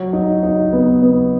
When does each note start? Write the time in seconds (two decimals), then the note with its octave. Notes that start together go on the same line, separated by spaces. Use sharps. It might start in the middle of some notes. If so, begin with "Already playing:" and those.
Already playing: F#3
0.13 D#4
0.43 D#4
0.73 B3
1.02 B3